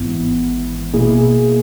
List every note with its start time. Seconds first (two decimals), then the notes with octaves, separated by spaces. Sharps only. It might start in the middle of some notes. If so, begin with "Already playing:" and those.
Already playing: G#1 G#2 E3 B3 E4
0.94 B2 A#3 E4 G#4